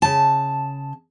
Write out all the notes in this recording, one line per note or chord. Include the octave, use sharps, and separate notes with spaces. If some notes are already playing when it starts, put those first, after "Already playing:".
C#3 A5